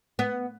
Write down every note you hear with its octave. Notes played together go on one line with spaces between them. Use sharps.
B3